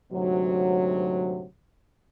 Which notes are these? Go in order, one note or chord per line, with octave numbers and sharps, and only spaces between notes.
D2 G#2 C3 F#3